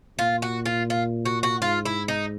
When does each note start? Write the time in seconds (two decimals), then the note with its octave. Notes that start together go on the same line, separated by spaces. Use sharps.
0.18 A#2 F4
0.42 F#4
0.66 F4
0.90 F4
1.25 F#4
1.43 F#4
1.61 G#2 F4
1.85 E4
2.08 D#4